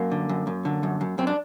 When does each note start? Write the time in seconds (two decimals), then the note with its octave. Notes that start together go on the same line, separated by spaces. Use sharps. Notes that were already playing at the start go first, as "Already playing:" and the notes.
Already playing: F#2 A#3
0.11 D3
0.29 F#2
0.47 F#2
0.65 D3
0.83 F#2
1.01 F#2
1.18 F#2 C4
1.27 D4